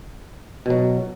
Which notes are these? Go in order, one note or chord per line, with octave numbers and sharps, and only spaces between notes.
B2 F#3